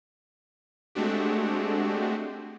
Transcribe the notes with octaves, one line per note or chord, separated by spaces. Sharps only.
G#3 A3 C4 D4 F#4 G4